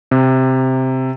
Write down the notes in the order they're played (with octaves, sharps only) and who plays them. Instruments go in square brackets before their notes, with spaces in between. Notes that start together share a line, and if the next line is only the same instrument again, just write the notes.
[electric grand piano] C3